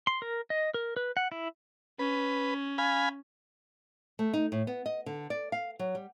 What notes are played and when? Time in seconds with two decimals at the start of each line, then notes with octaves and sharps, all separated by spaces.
0.07 C6
0.22 A#4
0.50 D#5
0.74 A#4
0.96 B4
1.17 F#5
1.32 E4
1.99 C#4 B4
2.78 F5 G#5 B5
4.19 A3
4.33 D#4
4.52 A2
4.67 B3
4.86 D#5
5.06 D3
5.30 D5
5.52 F5
5.79 F#3
5.95 G3